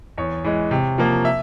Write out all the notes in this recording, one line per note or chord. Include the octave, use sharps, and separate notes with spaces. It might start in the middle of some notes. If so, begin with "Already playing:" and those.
E2 C#5
E3 G#3
C3
F3 A#3
E5